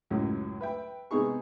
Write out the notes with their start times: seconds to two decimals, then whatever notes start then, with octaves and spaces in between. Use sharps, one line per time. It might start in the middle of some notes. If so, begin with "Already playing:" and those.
0.11 C#2 F#2 A2 F#3
0.61 B4 E5 G5
1.11 C3 G#3 B3 D#4 G#4 C#6